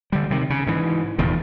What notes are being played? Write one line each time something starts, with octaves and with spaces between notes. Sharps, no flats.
D3 G3
C3 D#3
C#3
G#2 E3
F1 E2 A#2 D#3